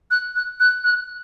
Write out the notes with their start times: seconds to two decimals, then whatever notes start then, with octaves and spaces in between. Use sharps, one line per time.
0.11 F#6
0.35 F#6
0.60 F#6
0.84 F#6